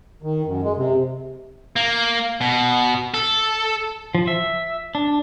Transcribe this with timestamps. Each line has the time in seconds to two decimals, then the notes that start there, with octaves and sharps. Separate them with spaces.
0.22 D#3
0.45 F#2
0.63 G#3
0.77 C3
1.76 A#3
2.41 B2
3.14 A4
4.15 F3
4.27 E5
4.95 D4